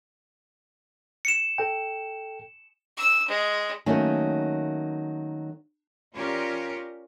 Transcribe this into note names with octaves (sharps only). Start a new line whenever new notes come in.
C#7 E7
A4 G5
E6
G#3
D#3 F#3 A3 A#3 C#4
C#4 F4 G4 A#4 D5